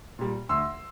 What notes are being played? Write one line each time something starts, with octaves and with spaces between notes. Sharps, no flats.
A#2 G3
D2 C6 E6